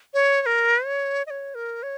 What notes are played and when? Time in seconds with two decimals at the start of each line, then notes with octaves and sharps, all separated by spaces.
0.14 C#5
0.42 C#5
0.46 A#4
0.85 C#5
1.27 D#5
1.30 C#5
1.55 A#4
1.83 C#5